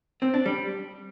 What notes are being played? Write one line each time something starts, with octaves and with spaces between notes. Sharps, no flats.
C4
D4
G3